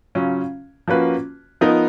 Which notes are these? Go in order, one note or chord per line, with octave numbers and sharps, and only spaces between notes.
C#3 F#3 C#4 F4
F3 A#3 C#4 F#4 B4
F3 B3 D#4 A#4